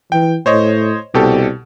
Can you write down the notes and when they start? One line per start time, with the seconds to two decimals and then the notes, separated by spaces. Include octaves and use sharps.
0.12 E3 G5
0.46 A2 C5 C#5 D#5
1.14 C2 B2 G4 A4